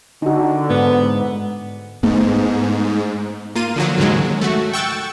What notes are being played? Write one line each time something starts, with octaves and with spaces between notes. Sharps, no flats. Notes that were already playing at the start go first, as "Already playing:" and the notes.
D3 D#4 F#4
G#2 B3
G#2 A3 B3
A#3 F4 D#7
D3 F3 F#3
D#2 G#2 C#3 F#3 G#3
A3 F#4
G5 C#6 E6 F#6 A6